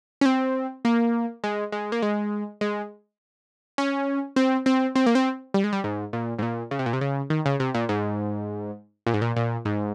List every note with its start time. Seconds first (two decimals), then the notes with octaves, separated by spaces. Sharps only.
0.21 C#4
0.26 C4
0.85 A#3
1.44 G#3
1.72 G#3
1.92 A#3
2.02 G#3
2.61 G#3
3.78 C#4
4.36 C4
4.66 C4
4.96 C4
5.06 A#3
5.15 C4
5.54 G3
5.64 G#3
5.73 G3
5.84 G#2
6.13 A#2
6.39 G#2
6.42 A#2
6.71 C#3
6.79 C3
6.86 A#2
6.93 C3
7.01 C#3
7.30 D#3
7.46 C#3
7.60 C3
7.74 A#2
7.89 G#2
9.06 A#2
9.14 G#2
9.22 A#2
9.36 A#2
9.65 G#2